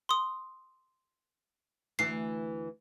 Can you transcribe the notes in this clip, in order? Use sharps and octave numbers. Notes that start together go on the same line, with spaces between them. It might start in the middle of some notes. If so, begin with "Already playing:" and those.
C6 D#6
D2 E3 C7